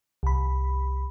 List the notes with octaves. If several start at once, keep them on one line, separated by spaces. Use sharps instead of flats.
C2 B5